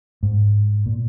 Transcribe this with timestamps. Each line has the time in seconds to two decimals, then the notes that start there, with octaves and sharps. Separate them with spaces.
0.23 G#2
0.86 A#2